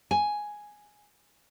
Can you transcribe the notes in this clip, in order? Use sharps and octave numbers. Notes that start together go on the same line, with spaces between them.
G#5